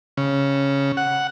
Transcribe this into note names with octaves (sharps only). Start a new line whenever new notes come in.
C#3
F#5